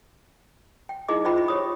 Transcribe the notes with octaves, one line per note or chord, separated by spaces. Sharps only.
G5
D#4 E4 G#4 D#5 E5 D6
F4 C5 D#5 E5 G5 B5
E5 B5
G4 C#5 D#6